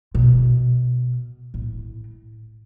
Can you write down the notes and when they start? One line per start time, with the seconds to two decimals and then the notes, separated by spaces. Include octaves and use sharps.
0.15 B2
1.54 A2